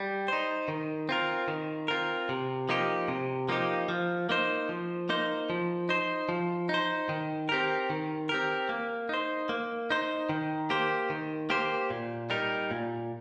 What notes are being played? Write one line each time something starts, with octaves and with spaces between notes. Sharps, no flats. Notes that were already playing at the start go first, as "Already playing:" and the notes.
Already playing: G3
D#4 C5
D#3
C4 F4 A#4
D#3
C4 F4 A#4
C3
F3 A#3 D#4 G4
C3
F3 A#3 D#4 G4
F3
A#3 D#4 C5
F3
A#3 D#4 C5
F3
D#4 C5
F3
D#4 C5
D#3
C4 G4 A#4
D#3
C4 G4 A#4
A#3
D#4 C5
A#3
D#4 C5
D#3
A#3 G4 C5
D#3
A#3 G4 C5
A#2
G3 D#4 A#4
A#2